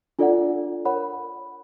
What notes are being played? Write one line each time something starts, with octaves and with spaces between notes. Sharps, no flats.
D4 F4 A4 D5 F#5
A#4 C#5 F#5 B5